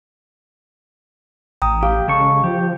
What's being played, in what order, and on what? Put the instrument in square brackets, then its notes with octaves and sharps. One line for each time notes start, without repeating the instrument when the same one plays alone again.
[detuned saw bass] A1 [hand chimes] G5 A#5 D#6
[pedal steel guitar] G4 [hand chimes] F5
[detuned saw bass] C#3 [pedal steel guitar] G#3 A4 C#6
[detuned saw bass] F3 [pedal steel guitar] G4